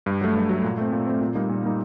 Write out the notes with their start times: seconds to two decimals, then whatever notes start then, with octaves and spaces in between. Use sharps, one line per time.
0.06 G2
0.21 F#3 A3
0.35 G2
0.49 F#3 A3
0.64 A#2
0.77 A3 C4
0.92 A#2
1.07 A3 C4
1.21 A#2
1.35 G3 A#3 D#4
1.49 A#2
1.63 G3 A#3 D#4